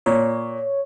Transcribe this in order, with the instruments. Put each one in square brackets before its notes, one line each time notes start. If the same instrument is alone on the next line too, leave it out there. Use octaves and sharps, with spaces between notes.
[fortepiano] A#2 [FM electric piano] C#5